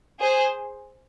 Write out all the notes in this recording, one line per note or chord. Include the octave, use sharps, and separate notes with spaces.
G#4 C5